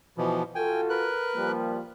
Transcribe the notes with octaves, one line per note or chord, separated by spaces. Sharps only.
B2 E3 F3
F4 F#4 A4 G5 G#5
A#4 B4 F#6
F3 G3 A#3